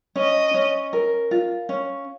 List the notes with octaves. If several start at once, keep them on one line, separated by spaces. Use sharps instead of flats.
C#4 D#5
C#4
A#4
F4
C#4